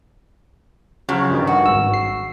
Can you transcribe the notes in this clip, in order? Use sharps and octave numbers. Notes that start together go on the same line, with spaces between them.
C#3 F3 F#3
G2 D#3
F#4
G#1 E6
C7